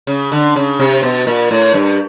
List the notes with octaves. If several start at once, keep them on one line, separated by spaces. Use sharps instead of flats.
C#3
D3
C#3
C3
B2
A#2
A2
G2